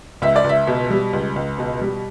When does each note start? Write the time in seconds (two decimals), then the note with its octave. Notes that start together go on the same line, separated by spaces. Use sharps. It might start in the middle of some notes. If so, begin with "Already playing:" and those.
0.22 C#2 E5
0.36 D5
0.44 C#2
0.49 E5
0.67 B2
0.90 G3
1.13 C#2
1.36 C#2
1.58 B2
1.81 G3